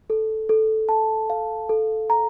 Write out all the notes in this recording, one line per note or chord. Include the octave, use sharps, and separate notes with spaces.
A4
A4
A5
F5
A4
A#5